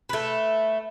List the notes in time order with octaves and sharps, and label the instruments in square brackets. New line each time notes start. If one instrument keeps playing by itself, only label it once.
[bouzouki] A3 B4